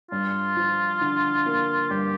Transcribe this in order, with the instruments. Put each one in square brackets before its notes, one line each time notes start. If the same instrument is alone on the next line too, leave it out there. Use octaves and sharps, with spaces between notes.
[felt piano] G2 [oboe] F4
[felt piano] F3
D3
A#3
[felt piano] G2 [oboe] G4